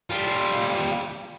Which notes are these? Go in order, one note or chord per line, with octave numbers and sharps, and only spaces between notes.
G3 F4